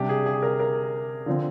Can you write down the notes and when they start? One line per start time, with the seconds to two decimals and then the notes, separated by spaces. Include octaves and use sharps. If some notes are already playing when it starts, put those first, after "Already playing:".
Already playing: C3 G3 D4 G4
0.09 G#4
0.26 G#4
0.43 A#4
0.60 A#4
1.26 D3 F3 C4